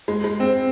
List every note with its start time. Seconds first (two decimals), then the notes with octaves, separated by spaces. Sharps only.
0.08 G#3
0.24 G#3
0.40 C4